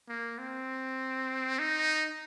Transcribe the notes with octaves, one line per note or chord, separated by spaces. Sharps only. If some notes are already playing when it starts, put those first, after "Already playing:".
A#3
C4
D#4